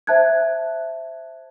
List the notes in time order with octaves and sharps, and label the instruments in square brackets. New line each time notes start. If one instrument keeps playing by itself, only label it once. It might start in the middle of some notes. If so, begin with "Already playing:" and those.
[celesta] C5 E5 A5 F#6 G#6